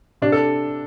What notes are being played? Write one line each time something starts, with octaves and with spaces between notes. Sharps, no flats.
C3 D4
A4